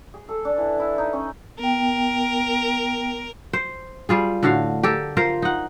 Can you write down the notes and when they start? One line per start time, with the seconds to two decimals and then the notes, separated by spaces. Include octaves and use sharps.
0.14 G#4
0.29 A4
0.45 D4
0.58 E3
0.80 E4
0.98 D#4
1.13 C#4
1.59 B3 A#4 G5
3.53 C5
4.09 G3 F4 G#4
4.43 A2 D3 F#4 F5
4.83 G4 A4 A#4
5.17 F4 A#4 C5
5.42 D#4 F#5